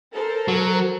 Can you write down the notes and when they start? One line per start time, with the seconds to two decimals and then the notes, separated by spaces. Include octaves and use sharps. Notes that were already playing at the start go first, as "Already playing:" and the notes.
0.14 A4 A#4 C5
0.48 F#3